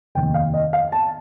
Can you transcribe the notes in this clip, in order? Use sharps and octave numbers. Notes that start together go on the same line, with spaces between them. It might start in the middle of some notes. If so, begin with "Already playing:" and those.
F1 D#2 D#3 G5
F5
D#5
F5
A5